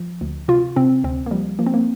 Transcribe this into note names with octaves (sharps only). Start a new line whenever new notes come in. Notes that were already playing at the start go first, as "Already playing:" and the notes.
Already playing: F3
D2
C3 F4
C3 C4
D2 C4
A#3
F3 G3
F3 A#3
C4
A#3